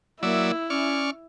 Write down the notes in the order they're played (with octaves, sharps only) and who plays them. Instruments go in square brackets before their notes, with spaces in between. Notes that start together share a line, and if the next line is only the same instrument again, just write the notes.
[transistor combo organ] F#3 D5 E5 [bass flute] A#3 [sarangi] E4
[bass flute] C#4 [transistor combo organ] D5 C#6 F6